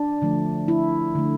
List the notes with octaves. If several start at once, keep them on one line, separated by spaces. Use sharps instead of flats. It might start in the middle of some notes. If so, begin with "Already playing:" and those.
Already playing: D4
D3 F3 A3
E4
D3 A3